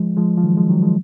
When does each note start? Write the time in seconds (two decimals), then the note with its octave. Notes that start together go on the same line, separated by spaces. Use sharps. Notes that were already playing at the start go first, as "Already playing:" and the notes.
Already playing: F3 G#3
0.17 F3 G#3
0.38 F3
0.44 D#3 F#3
0.57 F3 G#3
0.69 D#3 F#3
0.82 F3 G#3